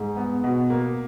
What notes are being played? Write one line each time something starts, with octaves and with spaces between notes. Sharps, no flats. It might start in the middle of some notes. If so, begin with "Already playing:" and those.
Already playing: G#2
B3
B2
A#3